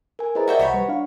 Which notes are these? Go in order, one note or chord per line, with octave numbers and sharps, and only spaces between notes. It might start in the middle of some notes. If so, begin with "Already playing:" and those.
A#4 G#5
E4 G#4 B4 C5 D#5 A#5
F#4 A#4 D5 E5 G5
C2 F#4 C#5 B5
G3 B4
D4 F5